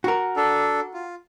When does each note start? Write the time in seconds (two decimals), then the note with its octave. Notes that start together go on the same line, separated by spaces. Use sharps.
0.04 F#4 A#4
0.36 D4 A4
0.94 F4